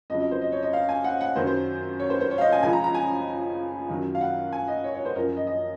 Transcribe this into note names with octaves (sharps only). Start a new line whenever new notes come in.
F2 C#3 F#3 D#5
D#5
C5
D#5
C#5
D#5
F5
G#5
F#5
F#5
F#2 D#3 F#3 C5
C5
C#5
C5
C5
C#5
F5
D#5
G#5
C#2 C#3 F3 G#5
A#5
A#5
G#5
F#2 D#3 F#3
F5
F#5
G#5
D#5
C#5
C#5
C5
F#2 F3 A#4
D#5
D#5